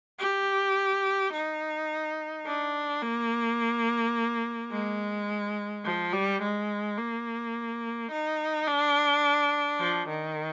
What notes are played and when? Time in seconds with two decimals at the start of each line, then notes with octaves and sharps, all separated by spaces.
0.19 G4
1.33 D#4
2.46 D4
3.02 A#3
4.71 G#3
5.85 F3
6.13 G3
6.42 G#3
6.98 A#3
8.11 D#4
8.67 D4
9.80 F3
10.09 D#3